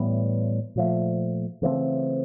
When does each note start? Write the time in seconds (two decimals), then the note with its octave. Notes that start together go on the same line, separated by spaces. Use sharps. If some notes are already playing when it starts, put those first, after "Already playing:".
Already playing: A2 E3 G3 B3
0.76 A#2 F3 A3
1.62 C#3 E3 A3 C4